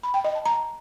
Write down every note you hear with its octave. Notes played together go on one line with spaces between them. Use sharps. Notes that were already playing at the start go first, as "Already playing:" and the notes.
B5
G5
D#5
A5
A#5